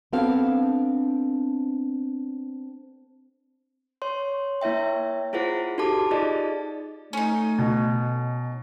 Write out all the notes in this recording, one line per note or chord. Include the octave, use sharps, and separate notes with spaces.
B3 C4 D4 A4 C#5 F5
C#5 C6
A#3 E4 C#5 E5 G5
E4 F4 G#4 C5 F#5
D#4 F#4 G4 A4 A5 D6
D#4 F4 G#4 D5 D#5
A3 C#4 D#4
B2